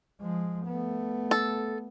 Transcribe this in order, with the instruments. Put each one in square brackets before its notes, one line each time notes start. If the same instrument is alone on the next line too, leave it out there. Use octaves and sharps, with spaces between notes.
[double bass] F3 G#3
A3 B3
[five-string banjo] A4